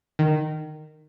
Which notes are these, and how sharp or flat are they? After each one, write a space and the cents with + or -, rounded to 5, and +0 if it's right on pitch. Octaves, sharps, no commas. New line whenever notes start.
D#3 -15